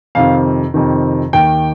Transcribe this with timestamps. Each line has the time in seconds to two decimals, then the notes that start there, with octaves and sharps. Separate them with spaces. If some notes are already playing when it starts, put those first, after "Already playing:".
0.15 F2 C3 D#3 F5
0.74 F2 C3 D#3
1.33 D#2 D#3 G5